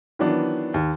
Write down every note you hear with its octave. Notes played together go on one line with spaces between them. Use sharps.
D#3 E3 F#3 B3 D4
D#2